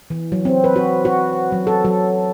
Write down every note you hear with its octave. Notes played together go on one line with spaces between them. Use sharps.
E3
F#3
C4
B4
F#4
F#4
F#3
A4
F#3